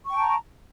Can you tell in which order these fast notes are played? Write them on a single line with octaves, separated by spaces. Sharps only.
C#6 G5 A5 A#5